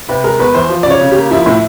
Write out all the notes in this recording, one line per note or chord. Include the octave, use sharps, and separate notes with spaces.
C3 B4
G#3 A#4
E2 B4
E3 C5
F3
D5
C#3 C#5
C#3
G4
A#3
F3 E4
A2 E4